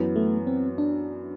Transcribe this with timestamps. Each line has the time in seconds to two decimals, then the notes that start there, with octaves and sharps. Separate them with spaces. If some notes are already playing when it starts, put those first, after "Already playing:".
Already playing: F#2 E3 B3
0.16 A3
0.47 C4
0.78 D4